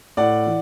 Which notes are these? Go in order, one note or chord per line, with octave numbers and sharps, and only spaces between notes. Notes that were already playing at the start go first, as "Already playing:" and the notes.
A2 D5 F#5
E3